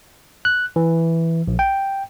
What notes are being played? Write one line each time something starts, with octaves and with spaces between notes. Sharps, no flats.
F#6
E3
A#1
G5